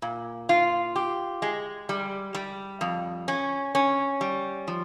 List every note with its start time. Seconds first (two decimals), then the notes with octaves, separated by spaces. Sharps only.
0.02 A#2
0.49 F4
0.96 G4
1.42 G#3
1.89 G3
2.35 G3
2.81 F2
3.28 C#4
3.75 C#4
4.21 G3
4.68 F3